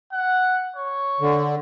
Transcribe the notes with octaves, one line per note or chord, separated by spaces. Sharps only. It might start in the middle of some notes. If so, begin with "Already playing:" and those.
F#5
C#5
D3